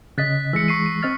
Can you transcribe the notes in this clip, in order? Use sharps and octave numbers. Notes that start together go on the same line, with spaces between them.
C#3 D#5 F#6 A6 B6
E3 G#3 E6 A#6 C#7
C#6 C7 D#7
D#7
C4 D#5 F6 A6